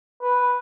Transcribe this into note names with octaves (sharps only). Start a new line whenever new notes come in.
B4